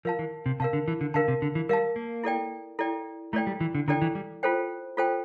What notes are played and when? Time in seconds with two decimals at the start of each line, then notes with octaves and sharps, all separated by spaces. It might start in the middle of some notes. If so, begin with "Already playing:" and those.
0.05 F3 A#4 F5 A5
0.19 E3
0.46 C3
0.60 C3 A#4 F5 A5
0.73 D3
0.88 E3
1.01 D3
1.14 D3 A#4 F5 A5
1.28 C3
1.42 D3
1.55 E3
1.69 G3 A#4 F5 A5
1.96 A#3
2.24 E4 A4 D5 G5
2.79 E4 A4 D5 G5
3.33 A3 E4 A4 D5 G5
3.47 G3
3.60 E3
3.75 D3
3.88 D3 E4 A4 D5 G5
4.02 E3
4.15 G3
4.43 F4 A4 C5 G5
4.97 F4 A4 C5 G5